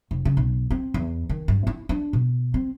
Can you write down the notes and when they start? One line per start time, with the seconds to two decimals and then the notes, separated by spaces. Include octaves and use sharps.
0.11 F1
0.25 C#3
0.37 B1
0.70 C4
0.94 E2
1.29 D#3
1.48 G2
1.67 E4
1.89 D4
2.13 B2
2.54 C4